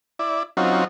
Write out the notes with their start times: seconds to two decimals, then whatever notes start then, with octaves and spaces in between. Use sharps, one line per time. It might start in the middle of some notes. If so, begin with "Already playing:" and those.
0.19 E4 D5
0.57 F#3 C4 C#4 D#4 F4 F#4